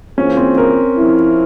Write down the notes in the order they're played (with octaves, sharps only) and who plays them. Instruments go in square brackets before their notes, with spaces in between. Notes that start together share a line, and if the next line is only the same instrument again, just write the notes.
[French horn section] E3 A#3 F4 G#4 C5 [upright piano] C#4
[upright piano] C4
A#4
[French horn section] F3 C4 E4